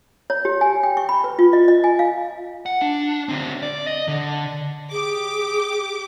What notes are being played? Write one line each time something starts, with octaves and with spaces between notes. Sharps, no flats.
C#5
G4
G#5
G5
C#6
B5
B4
F4
D#5
D#5
G#5
F5
F#5
D4
D3 C4
D5
D#5
D3
G4 G#4 D6